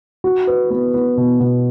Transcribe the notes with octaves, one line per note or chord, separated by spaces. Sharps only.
F#4
B4
B3
B3
B2
B2